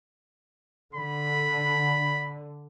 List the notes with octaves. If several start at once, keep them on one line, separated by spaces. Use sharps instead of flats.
D3 B5